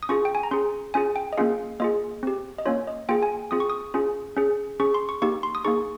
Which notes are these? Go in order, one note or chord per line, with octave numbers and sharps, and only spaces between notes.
D#6
C#4 F4 G#4 C#6
G5
G#5
A#5
C#4 G#4 C6
C#4 F4 G#4 G#5
G5
D#5
A#3 C#4 F4 G#4 F5
A#3 F4 G#4 D#5
C4 G4
D#5
A#3 C#4 F4 C#5
D#5
A#3 F4 G#4 G5
G#5
C4 F4 G#4 D#6
C#6
D#6
C#4 F4 G#4
C#4 G#4
C#4 G#4 C#6
C6
C#6
A#3 D#4 G4 C#6
C6
D#6
A#3 D#4 G#4 C#6